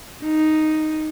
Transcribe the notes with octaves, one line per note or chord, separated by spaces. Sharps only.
D#4